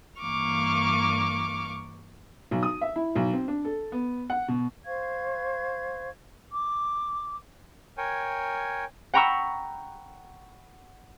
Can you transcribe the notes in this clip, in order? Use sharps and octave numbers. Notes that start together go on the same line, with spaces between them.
G2 E3 A#3 C#6 D6 F6
B1
D#6
E5
E4
B1
C4
D4
A4
B3
F#5
B2
C5 F5 C#6 G#6
D6
A#4 C#5 G5 G#5
F#5 G5 A#5 B5 C#6 E6